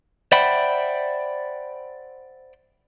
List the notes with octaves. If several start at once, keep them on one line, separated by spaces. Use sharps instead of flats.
C5 D5 E5 F#5 G5 B5